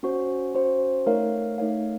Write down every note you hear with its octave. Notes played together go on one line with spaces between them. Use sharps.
C#4 F#4 C5
C#4 F#4 C5
A3 D#4 A#4 C#5 F5
A3 D#4 A#4 C#5 F5